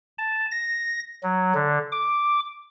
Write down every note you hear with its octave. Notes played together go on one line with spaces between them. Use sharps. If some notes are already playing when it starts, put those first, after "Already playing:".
A5
A#6
F#3
D3
D6